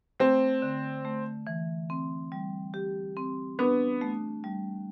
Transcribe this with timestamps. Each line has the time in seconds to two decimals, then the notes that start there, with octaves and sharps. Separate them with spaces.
0.20 A3 C4
0.62 D3
1.05 A3
1.47 E3
1.90 C4
2.32 G3
2.74 G4
3.17 C4
3.59 B3 D4
4.01 A3
4.44 G3